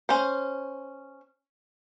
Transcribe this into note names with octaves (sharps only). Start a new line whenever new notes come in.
C#4 C5